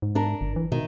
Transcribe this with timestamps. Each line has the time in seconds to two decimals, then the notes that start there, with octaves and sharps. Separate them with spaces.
0.02 G#2
0.15 D4 A#4
0.41 G1
0.56 E3
0.72 B2 D#3